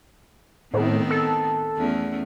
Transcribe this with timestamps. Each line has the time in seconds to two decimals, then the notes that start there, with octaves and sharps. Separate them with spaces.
0.74 A2 D#3 B3 C4
1.10 A4
1.77 E2 A3 C#4